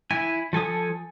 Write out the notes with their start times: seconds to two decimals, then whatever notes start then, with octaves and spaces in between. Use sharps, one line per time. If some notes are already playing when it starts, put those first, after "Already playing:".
0.11 E4 G#5
0.53 F3 A4 G#5 D#6